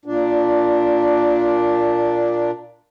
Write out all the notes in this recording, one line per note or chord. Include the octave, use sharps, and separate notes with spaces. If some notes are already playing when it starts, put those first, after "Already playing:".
A#2 D4